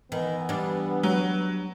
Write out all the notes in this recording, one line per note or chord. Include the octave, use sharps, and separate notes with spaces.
D#3 E3 B3
G3 D4
F#3